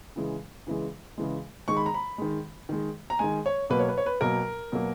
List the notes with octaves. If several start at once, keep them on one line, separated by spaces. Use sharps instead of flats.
C#3 E3 G#3
C#3 E3 G#3
C#3 E3 G#3
D#3 G#3 C#6
B5
A#5
B5
D#3 G#3
D#3 G#3
A#5
D#3 G#3 G#5
C#5
B2 F#3 A#3 B4
C#5
B4
C#5
B4
B2 F#3 A#3 A#4
B2 F#3 A#3